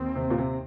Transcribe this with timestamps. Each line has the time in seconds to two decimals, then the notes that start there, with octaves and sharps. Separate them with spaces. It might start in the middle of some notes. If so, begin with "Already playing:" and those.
Already playing: D#2 D#3 C4
0.15 C3
0.30 A#2
0.38 C3